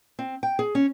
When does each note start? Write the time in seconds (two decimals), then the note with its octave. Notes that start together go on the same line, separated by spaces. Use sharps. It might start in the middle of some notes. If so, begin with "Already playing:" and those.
0.19 C4
0.43 G5
0.59 G#4
0.75 C#4